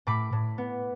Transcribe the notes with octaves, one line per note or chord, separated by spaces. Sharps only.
A2 B5 D6
A2
B3